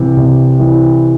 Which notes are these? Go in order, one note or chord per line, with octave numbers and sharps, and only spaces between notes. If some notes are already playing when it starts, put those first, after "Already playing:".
Already playing: C3 E3
C3
E3